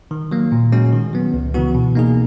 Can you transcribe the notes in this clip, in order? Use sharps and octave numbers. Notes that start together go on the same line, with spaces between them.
D#3
F#3 A#3
A#2
G#3 C#4 F#4
D#3
F#3 B3
C#2
C#3 E3 B3 F#4
B2
A#3 D#4 G#4